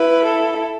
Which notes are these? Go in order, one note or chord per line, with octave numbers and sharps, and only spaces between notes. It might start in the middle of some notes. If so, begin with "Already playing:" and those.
Already playing: E4 B4
A4